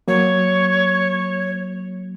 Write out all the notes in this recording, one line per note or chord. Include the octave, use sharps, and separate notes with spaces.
F#3 A#3 C#5